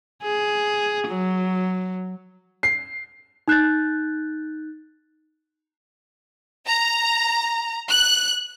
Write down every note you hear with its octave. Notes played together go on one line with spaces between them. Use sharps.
G#4
F#3
C7
D#4 F#6 G6 A6
A#5
F#6